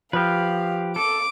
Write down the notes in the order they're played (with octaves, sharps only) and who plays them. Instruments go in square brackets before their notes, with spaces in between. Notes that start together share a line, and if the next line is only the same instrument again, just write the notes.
[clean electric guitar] F3 [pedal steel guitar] G4 B4 [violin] F5
[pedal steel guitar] A4 [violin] D6